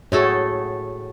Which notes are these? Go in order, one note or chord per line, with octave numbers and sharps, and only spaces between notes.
A2 A3 F#4 G#4 A4 C#5